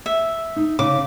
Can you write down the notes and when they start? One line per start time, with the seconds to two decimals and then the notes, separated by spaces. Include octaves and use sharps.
0.06 E5
0.56 D#4
0.79 C#3 D6